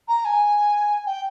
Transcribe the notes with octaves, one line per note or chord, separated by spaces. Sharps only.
A#5
G#5
G5